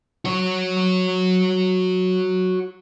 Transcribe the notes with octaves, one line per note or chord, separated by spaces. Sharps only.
F#4 C#5